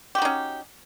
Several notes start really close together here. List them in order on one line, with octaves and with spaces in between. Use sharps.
G4 F#4 D#4 C#4